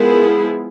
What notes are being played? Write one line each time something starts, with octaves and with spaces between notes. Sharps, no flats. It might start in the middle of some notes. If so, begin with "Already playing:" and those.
Already playing: F3 G#3 B3 E4 G#4 A#4